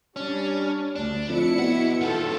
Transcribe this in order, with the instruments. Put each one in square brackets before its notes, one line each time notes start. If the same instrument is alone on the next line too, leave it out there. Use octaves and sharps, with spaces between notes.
[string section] G3 D4 [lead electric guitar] C#4
[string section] D2 [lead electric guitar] D4
[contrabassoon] F2 [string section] E4 E5 C#7
[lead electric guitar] F2 F#5 [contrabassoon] B2
[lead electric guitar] A#2 D#3 [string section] F4 A4